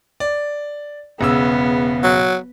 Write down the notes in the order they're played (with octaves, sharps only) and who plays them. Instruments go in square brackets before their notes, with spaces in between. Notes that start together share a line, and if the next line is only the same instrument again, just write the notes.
[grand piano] D5
[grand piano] E1 C#3 E6 [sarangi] B3
[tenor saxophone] F#3